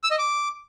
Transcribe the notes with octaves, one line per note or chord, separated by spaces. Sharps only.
E6
D#5
D6